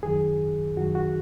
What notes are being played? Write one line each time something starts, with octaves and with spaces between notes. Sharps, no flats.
F#2 D#3 F#3 G#4
F#2 D#3 F#3 F#4
F#4